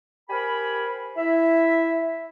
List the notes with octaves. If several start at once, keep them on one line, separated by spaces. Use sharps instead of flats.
G4 A#4 C5 G#5 B5
E4 E5